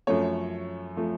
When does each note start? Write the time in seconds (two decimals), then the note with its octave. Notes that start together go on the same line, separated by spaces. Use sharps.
0.07 F#2 F3 A3 C#5
0.97 F3 A3